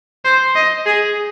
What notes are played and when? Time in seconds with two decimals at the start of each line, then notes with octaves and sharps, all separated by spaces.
0.25 C5
0.55 D#5
0.86 G#4